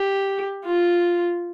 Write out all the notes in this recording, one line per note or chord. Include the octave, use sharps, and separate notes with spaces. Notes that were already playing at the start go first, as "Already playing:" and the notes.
Already playing: G4
F4